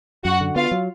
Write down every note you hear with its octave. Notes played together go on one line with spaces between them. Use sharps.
F#2 F#4 F#5
D3
B3 F4 F5
F#3